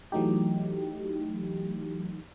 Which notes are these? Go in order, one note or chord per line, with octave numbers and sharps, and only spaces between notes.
E3 F#3 A3 D#4 G4